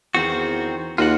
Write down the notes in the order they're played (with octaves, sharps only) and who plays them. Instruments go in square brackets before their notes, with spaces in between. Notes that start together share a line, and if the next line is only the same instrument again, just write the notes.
[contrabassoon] E2 [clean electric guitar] D#3 C4 F#4
[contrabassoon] D#2 [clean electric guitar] F4 F#4 F#5